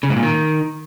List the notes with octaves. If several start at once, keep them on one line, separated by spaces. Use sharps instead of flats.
C#3
G#2
A#2
D#3